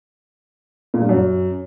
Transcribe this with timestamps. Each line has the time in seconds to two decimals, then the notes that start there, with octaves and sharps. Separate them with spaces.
0.94 A#2
1.01 G2
1.09 F#2